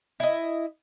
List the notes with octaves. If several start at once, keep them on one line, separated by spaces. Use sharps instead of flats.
E4 D#5